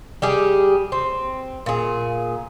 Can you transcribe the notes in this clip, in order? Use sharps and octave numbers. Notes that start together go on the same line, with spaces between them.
G3 G4 G#4
C4
A#2 G#4